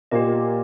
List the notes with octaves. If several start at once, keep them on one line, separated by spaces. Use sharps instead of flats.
A#2 A#3 G4 C5 D#5